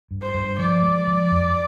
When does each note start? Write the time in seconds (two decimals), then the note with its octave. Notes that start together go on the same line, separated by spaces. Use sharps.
0.11 G2
0.22 C5
0.34 G2
0.59 F3 D5
0.83 G#3
1.07 F3
1.31 F2